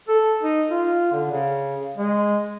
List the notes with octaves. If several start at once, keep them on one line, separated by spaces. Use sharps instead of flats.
A4
D#4
F4
D3
C#3
G#3